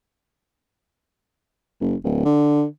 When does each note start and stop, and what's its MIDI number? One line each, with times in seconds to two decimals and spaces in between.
1.81 1.95 30
2.04 2.25 26
2.25 2.64 50